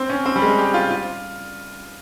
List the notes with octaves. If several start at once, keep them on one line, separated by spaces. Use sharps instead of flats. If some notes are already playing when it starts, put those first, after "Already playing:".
Already playing: C4
C#4
C4
G3
G#3
G4
F4
F4